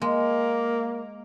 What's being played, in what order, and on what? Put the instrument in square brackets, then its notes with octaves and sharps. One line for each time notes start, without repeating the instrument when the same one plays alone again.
[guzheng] G#3 [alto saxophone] A#3